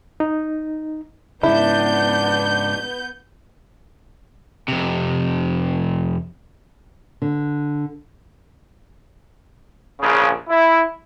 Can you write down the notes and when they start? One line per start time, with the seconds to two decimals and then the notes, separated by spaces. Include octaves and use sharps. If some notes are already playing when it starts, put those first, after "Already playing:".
0.20 D#4
1.43 G#2 C#3 B3 D4 E4 G6
4.68 F2 C3
7.22 D3
10.00 A#1 C#3
10.48 E4